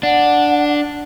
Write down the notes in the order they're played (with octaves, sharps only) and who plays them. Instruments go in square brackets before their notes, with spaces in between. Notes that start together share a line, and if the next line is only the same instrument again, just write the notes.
[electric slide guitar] D4 [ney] F#5